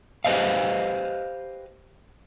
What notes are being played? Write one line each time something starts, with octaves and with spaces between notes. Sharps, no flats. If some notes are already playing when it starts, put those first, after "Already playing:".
G4 B4 C5 D#5 F5